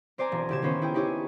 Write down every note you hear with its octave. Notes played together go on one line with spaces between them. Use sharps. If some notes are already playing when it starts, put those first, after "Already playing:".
C4 C5 D5 G#5 A#5
E1
D#1 C#3 G4 G#6 E7
D#3 B3 C#4 C5 E7
E4 G#4 G5
D#4 E4 G4 G#4 C#5